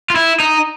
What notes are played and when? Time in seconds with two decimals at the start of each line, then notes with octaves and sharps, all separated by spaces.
0.10 F4
0.16 E4
0.40 D#4